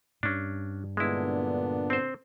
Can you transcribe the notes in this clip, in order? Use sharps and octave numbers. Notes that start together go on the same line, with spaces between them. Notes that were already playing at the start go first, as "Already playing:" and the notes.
G2 C#4 D4
A#2 D3 G#3 B3 D4 E4
C4 C5